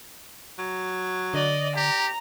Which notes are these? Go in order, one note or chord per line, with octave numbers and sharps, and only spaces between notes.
F#3
D3 D5 D#5
G4 A#5